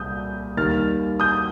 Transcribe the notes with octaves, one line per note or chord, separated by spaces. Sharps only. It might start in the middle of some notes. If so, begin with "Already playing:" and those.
Already playing: C2 A#2 G3 D#6 G6
D#2 D#3 G3 F6 A6
D#6 G6